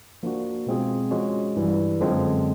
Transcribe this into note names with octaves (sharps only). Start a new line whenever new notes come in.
F3 A#3 D4 F#4
B2 G#3 C4 F4 G#4
F3 G#3 C#4 F#4
G2 E3 G3
F#2 D3 F3 G#3 C4